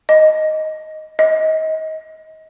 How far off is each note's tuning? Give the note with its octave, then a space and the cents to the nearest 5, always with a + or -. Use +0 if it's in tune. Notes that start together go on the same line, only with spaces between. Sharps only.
D#5 +0
D#5 +25